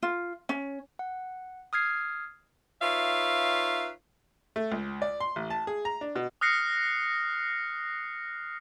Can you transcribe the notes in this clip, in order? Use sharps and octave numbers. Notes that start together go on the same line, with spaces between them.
F4
C#4
F#5
D#6 F6 G#6 C7
D#4 F4 B4 C#5 E5 F5
A3
C#2
D5
C6
A1
A5
G#4
A#5
D4
B2
D#6 F6 F#6 A#6 C7 C#7